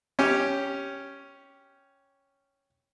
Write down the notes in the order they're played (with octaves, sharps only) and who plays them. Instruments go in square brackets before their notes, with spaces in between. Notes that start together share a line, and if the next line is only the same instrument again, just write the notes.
[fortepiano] C#4 G4